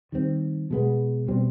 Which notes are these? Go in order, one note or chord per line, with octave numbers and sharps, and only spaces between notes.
D#3 G3 C4
B2 G#3 B3
B2 G3 C4